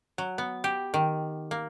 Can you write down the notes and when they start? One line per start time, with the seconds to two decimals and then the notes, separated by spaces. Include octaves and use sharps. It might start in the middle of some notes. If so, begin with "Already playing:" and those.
0.18 F#3
0.38 B3
0.64 G4
0.94 D#3
1.51 A#3